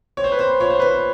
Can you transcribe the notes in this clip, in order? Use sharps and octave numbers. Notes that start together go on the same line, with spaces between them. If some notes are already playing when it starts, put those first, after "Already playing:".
C4 C#5
C5
B4
C4 C5
F4 C#5
C5
C4 B4
C5